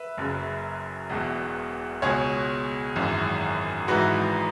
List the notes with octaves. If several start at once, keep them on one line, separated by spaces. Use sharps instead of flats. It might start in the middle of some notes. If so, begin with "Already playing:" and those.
Already playing: B4 E5
F#1 F#2 C#3
E1 E2 B2
C#2 B2 G#4 C#5
G#1 F#2 E3
G#1 G#2 E3 F#4 B4